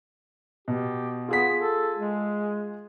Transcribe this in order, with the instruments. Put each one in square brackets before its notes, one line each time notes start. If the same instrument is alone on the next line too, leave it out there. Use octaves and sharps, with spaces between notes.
[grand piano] B2 [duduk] G4
[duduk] B3 [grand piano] F4 G#4 B6
[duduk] A4
G#3